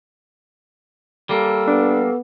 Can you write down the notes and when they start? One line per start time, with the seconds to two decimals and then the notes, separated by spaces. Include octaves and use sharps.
1.29 G3 A#3 A4
1.68 B3 D4